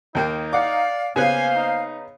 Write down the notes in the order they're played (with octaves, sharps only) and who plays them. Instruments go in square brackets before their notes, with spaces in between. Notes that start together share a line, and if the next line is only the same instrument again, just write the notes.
[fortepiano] D#2 A#3 G5 [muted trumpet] D#4
[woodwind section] D5 F5 [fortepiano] F#5 D6
[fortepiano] C#3 B3 F#6 [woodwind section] A#3 C5 F5 [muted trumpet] G#5
[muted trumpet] D#4